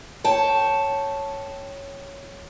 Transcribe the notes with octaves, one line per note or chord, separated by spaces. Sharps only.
C#5 G5 A5